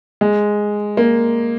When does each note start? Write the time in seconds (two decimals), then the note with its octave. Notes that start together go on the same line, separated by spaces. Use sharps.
0.21 G#3
0.97 A#3